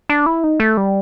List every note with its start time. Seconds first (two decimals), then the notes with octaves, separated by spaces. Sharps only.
0.09 D4
0.26 E4
0.44 D#4
0.60 A3
0.77 G3